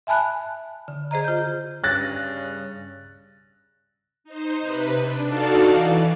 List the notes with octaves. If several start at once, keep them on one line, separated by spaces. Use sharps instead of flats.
E5 G#5 A5 B5 F#6
D3
G#4 C5 D#5 A#5
F4 G6
G2 C#3 F#6 A6 A#6
D#4 C5
C3 B4
D4
D#4 F#4 A4 D5 F5 A5
E3